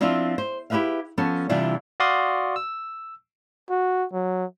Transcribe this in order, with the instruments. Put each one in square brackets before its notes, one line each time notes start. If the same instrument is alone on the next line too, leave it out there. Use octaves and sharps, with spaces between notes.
[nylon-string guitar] F3 C4 D4 E4 F4
C5
E4 G4 G#4 B4 E5 F5
F3 B3 C#4 A4
C3 E3 G3 D4 E4 F4
[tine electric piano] F#4 D5 F5 C6 D#6
E6
[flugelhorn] F#4
F#3